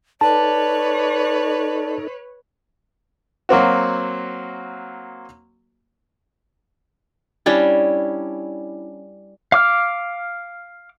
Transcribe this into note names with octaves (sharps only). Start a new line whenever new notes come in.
D#4 A4 B4 C#5 D5 A5
F#3 A#3 C4 F#4
G3 C#4 D4 E4
F5 D6 F6